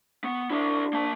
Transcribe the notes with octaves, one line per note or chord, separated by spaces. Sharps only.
B3 C#6
D4 E4 G4
A#3 A5